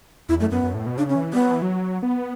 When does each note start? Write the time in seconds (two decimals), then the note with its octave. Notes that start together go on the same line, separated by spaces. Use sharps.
0.29 E2 E4
0.40 F#2 A3
0.51 F#2 B3
0.63 F#2
0.75 A2
0.86 B2
0.97 C#3 D4
1.09 C#4
1.15 E3
1.33 G3 B3
1.42 F#3
1.52 E3
1.62 F#3
2.03 B3